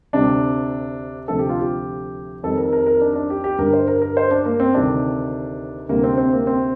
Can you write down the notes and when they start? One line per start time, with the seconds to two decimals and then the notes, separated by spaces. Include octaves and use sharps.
0.13 D2 C3 G3 D4
1.28 D2 C3 F3 A3 A4
1.39 G4
1.49 F4
1.59 G4
2.43 F2 D#3 G3 A4
2.57 A#4
2.73 A#4
2.87 A#4
3.01 D4
3.15 D4
3.30 G4
3.44 G4
3.59 G2 D3 G3 A#4
3.73 C5
3.88 A#4
4.02 A#4
4.17 C5
4.31 D4
4.45 A#3
4.60 C4
4.74 D2 C3 D#3 G3 D4
5.89 D2 C3 G3 A#3
6.04 C4
6.18 C4
6.32 A#3
6.47 C4